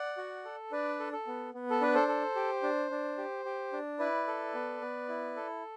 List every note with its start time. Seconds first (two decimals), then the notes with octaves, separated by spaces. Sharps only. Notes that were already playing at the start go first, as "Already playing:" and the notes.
Already playing: D5 F#5
0.17 F#4
0.45 A4
0.72 D4 B4 D5
1.00 A4
1.13 A4
1.27 B3
1.54 B3
1.70 A4
1.81 D4 B4
1.94 A4 C5
2.08 A4
2.36 G4
2.63 D4
2.91 D4
3.18 G4
3.45 G4
3.73 D4
3.99 E4 B4 D5
4.27 A4
4.54 B3
4.81 B3
5.08 E4
5.36 A4